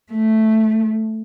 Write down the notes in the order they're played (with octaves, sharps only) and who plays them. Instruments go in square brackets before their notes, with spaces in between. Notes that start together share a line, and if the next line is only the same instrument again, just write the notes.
[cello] A3